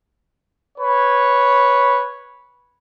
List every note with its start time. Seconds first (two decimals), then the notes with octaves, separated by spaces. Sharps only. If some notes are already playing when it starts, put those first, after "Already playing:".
0.78 B4 C#5